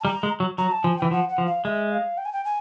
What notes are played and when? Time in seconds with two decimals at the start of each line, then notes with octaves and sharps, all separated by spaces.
0.01 A5
0.05 G3 A#5
0.23 G#3
0.40 F#3
0.58 F#3 A#5
0.72 A5
0.84 F3 G#5
0.98 E3 G5
1.11 F3 F#5
1.29 F#5
1.38 F3
1.46 F5
1.65 G#3 E5
1.92 F5
2.18 G5
2.25 G#5
2.33 G5
2.45 G#5